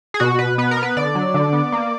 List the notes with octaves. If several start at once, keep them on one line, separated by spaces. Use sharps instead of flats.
G#4
B2 F#4
B2 B4
B3 B4
A#4
B3
B4
D3 D5
F#3
D3
B3
A#3